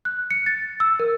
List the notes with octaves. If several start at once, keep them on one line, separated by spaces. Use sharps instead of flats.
F#6
C#7
A6
E6
A#4